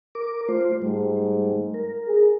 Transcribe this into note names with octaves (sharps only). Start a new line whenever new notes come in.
A#4 D6
A3 F4 C5
G#2 G3 A3
A#4
G#4